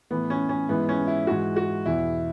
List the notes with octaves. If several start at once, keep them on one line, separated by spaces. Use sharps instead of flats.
A2 E3 B3
C#4
C#4
G#2 E3 B3
C#4
E4
G#2 E3 F#4
F#4
E2 B2 E4